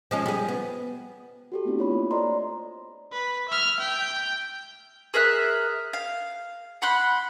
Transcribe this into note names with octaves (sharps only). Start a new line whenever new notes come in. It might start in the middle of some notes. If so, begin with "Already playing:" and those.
F3 G#3 C#4
G3 G#4
B3
F#4 G4 A4
A3 B3 C4 D4 E4
F4 C#5 B5
A#3
A4 C5 D5 D#5 A#5 C6
B4
E5 F6
G5
G#4 A#4 E5 F#6
F5
F#5 B5 C6 F#6